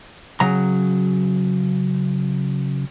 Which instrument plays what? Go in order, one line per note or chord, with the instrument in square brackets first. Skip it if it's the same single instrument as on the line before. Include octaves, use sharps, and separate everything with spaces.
[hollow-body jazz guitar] C#3 F#3 A#5